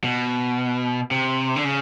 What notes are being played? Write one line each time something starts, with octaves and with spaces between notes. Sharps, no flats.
B2
C3
D3
C#3